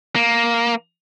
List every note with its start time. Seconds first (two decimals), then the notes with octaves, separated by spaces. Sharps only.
0.16 A#3